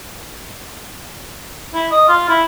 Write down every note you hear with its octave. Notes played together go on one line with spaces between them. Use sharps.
E4
D#5
F4
E4